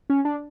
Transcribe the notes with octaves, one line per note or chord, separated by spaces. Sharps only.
C#4
D4